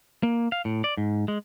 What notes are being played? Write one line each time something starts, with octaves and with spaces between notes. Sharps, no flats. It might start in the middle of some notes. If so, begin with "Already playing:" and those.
A#3
F5
A2
D5
G#2
G#3